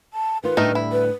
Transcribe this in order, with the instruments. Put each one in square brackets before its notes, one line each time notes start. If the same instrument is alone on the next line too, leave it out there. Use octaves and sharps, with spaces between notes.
[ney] A5
[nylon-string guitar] D#3 F4 [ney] B4
[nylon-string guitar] D2 A2 G3 [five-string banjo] D#3 A3 D#4
[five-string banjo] E4
[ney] B4